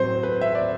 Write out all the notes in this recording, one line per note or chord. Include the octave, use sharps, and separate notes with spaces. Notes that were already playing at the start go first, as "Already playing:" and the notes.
Already playing: A2 F#3 C4 C5
B4
E5
D5